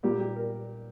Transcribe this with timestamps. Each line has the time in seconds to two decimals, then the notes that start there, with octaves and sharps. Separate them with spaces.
0.03 A#2 G3 G4
0.20 G4
0.36 A#4